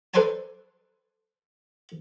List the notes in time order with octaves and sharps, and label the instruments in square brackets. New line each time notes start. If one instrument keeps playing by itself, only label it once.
[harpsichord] A4 B4 C5 D5 G#5 A5